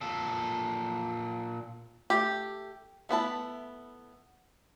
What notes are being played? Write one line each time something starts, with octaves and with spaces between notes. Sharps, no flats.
A#2 A4
A3 G4
A3 B3 E4 A5